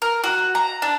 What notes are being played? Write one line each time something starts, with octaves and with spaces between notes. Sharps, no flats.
A#4
F#4
A#5
D4